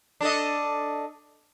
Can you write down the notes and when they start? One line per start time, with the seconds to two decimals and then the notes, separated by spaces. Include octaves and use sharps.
0.21 D4 A4 D#5